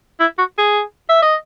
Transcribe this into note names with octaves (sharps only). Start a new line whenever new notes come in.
E4
F#4
G#4
E5
D#5